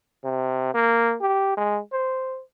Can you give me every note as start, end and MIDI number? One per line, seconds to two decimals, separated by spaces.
0.24 0.73 48
0.74 1.16 58
1.21 1.53 67
1.57 1.80 56
1.92 2.41 72